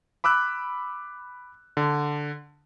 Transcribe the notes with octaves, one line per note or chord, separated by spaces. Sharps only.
B5 D6 E6 F#6
D3